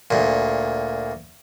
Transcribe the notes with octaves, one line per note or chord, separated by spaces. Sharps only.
D2 A#2